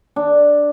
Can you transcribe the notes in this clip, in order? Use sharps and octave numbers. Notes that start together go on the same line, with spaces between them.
D4